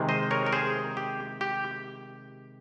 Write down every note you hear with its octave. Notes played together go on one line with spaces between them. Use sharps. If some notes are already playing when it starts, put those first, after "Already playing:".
Already playing: C3 D#3 G#3
C5 D#5
A#4 C#5
A#4
G#4 C5
G4
G4